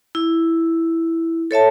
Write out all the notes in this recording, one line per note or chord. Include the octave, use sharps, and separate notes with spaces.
E4
A4 C#5 E5 A5